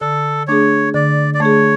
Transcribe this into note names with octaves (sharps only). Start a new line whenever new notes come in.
D3 A4
A3 D4 G#4 C#5
D3 D5
D5
A3 D4 G#4 C#5